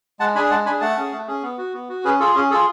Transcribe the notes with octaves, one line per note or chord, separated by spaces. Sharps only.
G#3 F#5 A5
D4 G#4 G#5 B5
G#3 F#5 A5
D4 G#5 B5
G#4
A3 F#5 A5
C#4 G#4
A3
C#4 G#4
B3
F#4
B3
F#4
C#4 G#4 B4
F4 G#4 A4
C#4 G#4
F4 G#4 A4